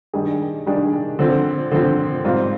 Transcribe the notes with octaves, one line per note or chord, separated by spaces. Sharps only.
D#3 G3 D4 G#4
D#3 G3 D4 G#4
D3 F3 C4
D3 F3 C4
G#2 G3 C4 F4